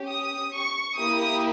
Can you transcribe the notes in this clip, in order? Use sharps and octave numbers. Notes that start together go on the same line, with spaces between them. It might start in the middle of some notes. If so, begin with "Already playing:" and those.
Already playing: C#4 G4
D#6
C#6
A#3 E4 G4 D#6